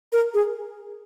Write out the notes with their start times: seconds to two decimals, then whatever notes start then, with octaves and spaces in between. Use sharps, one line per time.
0.13 A#4
0.34 G#4